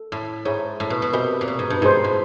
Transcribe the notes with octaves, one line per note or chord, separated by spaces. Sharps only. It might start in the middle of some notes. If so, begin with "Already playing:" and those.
Already playing: A4
A2
G#2 G#4 C#5 E5 G#5 B5
A2
B2
B2
C3 F#4 A#4 D#5 G#5 B5
A#2
B2
G#2
G2
G#2 D#4 G#4 C5
A2